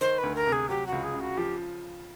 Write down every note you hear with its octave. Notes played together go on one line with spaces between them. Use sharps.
D#3 C5
B4
D2
A#4
C3
G#4
F#3 G4
F#4
C#2
G#4
C#3
F#4
F3 G4